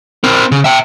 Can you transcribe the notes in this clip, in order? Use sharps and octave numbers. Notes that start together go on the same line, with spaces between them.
C4 A#4
C#3
E5 G5